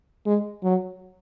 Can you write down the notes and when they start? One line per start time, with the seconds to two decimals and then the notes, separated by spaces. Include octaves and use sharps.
0.26 G#3
0.64 F#3